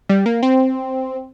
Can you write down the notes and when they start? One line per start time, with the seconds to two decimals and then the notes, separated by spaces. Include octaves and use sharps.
0.09 G3
0.26 A#3
0.43 C4